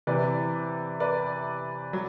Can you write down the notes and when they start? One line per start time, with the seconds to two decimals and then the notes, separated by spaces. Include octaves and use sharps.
0.07 C3 E3 B4 D5
1.00 B4 D5
1.93 F#3